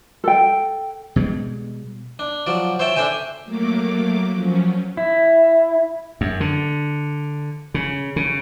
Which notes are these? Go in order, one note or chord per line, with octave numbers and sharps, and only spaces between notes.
A4 G5
B2 G3 G#3
D4
F3 F#3 D5
C5 C#5 E5 G5 A5
D4 A4 C5 E5 G5 G#5
F#3 A3 A#3 D6
F3 F#3 C#4
E4
F#2
D3
C#3
C#3